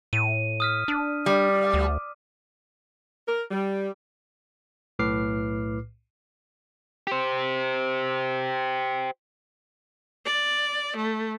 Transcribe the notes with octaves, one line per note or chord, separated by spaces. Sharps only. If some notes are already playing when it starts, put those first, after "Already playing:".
A2 D#7
D#6 F6 B6
D4
G3 D5
D2
A#4
G3
B1 A2 B4 D6 F6 C7
G4 C5
D5
A3